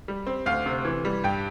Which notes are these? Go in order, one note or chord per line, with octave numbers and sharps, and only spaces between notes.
G3
C4
D2 F5
C3
E3
G3
G2 G5